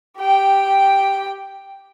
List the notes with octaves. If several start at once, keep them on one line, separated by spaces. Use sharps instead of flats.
G4 G5